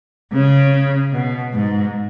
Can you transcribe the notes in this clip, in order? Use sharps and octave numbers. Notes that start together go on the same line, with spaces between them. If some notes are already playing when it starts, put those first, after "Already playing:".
C#3
B2
G#2